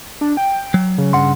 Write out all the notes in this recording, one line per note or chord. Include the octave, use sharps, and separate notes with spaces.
D4
G5
F#3
C#3
G2 F#5 C6